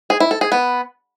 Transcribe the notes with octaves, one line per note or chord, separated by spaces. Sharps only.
G#4
E4
A4
G#4
B3